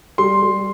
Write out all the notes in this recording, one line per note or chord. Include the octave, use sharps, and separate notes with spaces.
G3 C6
G3